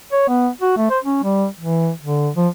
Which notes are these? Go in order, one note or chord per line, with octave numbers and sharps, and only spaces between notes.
C#5
B3
F#4
A3
C5
C#4
G3
E3
D3
F3